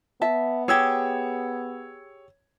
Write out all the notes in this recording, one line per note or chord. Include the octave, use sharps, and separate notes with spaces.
B3 E5 A5
G4 G#4 C#5 E6 G#6